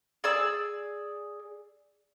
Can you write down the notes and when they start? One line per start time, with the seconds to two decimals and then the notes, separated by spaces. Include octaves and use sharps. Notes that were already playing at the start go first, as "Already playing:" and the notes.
0.24 G#4 D5 E6